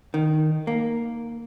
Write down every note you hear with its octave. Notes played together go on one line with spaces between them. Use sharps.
D#3
A#3